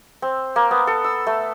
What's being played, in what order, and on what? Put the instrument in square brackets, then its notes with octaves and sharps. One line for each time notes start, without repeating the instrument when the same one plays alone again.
[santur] C4
A#3
B3
A4
E6
A3